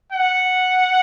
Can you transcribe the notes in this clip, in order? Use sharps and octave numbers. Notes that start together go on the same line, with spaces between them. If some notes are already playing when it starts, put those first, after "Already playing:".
F#5